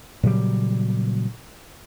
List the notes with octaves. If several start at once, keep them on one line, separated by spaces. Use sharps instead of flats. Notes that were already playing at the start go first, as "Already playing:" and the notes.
A#2 C#3 F#3 G3